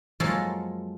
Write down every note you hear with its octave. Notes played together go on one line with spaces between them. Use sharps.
F#2 F3 G#3 A#3 A4 C#5